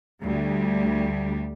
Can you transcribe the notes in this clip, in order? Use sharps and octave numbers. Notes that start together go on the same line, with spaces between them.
D2 G3